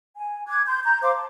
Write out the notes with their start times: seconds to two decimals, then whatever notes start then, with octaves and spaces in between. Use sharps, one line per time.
0.16 G#5
0.48 D6 F#6 G#6
0.67 C6 G6
0.84 A#5 G6
1.02 C5 F5 C6 D6
1.15 A5